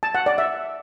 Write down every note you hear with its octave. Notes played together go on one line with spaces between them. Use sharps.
A5
F#5
D5
E5